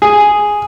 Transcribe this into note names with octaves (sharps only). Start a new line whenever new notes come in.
G#4